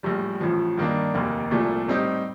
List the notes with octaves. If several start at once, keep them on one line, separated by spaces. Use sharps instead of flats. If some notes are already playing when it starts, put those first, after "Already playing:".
A#1 A2 G3
A1 A2 F3
G2 D#3 A#3 D4
F1 D#2 D#3 A#3
C2 A#2 F3 A3
A2 G3 C4 D#4 G4